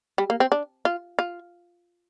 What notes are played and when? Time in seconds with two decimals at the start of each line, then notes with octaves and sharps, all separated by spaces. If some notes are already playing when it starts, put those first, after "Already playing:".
0.18 G3
0.30 A#3
0.40 C4
0.52 D4
0.85 F4
1.19 F4